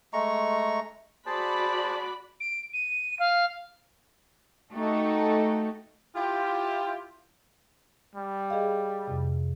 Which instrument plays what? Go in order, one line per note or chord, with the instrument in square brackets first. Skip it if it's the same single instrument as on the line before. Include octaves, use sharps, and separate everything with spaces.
[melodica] G#3 A3 A#5 C#6
[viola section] F#4 D5 B5 [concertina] G#4 C5 A5
[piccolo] D7
D#7
F5
[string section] A3 D#4 F#4 G4 A4
[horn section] E4 F4 G4
[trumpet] G3
[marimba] G#4 D#5 F5
F2 C3